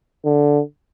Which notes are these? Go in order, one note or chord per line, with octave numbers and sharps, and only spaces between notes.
D3